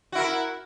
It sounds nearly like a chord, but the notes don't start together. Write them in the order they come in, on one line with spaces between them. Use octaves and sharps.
F#4 E4 A#4